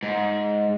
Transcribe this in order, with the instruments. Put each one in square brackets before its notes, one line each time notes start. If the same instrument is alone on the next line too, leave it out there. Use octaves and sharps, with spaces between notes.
[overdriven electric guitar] G#2